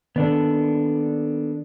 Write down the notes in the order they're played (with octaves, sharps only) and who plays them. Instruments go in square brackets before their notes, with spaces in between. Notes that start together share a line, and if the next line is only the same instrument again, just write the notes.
[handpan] D#3 [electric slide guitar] B3 D4 A4